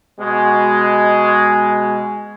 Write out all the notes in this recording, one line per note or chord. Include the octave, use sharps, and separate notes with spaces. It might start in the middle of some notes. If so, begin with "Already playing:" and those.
B2 G#3